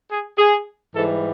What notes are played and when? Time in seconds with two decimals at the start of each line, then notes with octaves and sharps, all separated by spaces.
0.11 G#4
0.38 G#4
0.95 G#2 E3 G3 A4